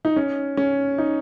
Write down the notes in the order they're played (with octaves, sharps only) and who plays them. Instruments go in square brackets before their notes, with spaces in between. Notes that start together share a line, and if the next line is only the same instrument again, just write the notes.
[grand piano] D#4
C#4
C#4
D#4